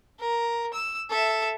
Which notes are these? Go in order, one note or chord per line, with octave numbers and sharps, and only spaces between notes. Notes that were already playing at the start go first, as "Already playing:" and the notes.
A#4
E6
A4 E5